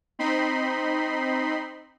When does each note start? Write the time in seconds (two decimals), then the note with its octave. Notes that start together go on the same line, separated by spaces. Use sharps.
0.19 C4 D#4 B5 C6